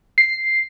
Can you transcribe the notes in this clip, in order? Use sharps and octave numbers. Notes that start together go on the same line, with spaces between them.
C7